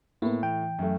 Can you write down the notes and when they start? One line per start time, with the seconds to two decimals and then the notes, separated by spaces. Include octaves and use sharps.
0.22 A2 A#3 B3
0.43 E3 G5
0.79 F#2 A3